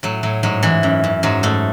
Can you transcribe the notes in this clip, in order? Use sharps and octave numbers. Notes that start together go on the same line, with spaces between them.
A2 F#3
A2 F#3
G#2 F#3
G#2 E3
F#2
F#2
G#2 F#3
G#2 A3